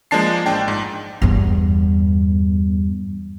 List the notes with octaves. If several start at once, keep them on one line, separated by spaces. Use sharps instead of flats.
F3 G#3 A#3 D4 A5 C7
A1 D4 G5 A5
G#2
E2 G2